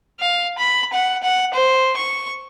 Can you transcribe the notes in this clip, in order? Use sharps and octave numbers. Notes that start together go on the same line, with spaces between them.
F5
B5
F#5
F#5
C5
C#6